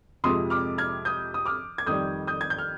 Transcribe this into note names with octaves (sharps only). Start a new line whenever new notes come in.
F2 C3 F3 G#3 C6 D#6
D6 F6
F6 G#6
D#6 G6
D#6
D6 F6
G#6
F2 D#3 G3 D#6 G6
D#6 G6
G#6
G6
F6